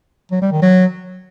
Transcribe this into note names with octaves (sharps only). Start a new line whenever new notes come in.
F#3
G3
D#3
F#3